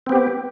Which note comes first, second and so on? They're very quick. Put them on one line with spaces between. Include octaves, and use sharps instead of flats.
C4 B3 G4